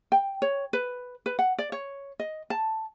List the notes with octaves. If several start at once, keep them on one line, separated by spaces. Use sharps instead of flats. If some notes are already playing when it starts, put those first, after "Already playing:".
G5
C#5
B4
B4
F#5
D5
C#5
D#5
A5